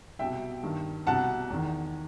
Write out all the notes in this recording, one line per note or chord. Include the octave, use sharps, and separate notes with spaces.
C2 B2 E5 G5
G2 D#3
C2 B2 F#5 A5
E2 D#3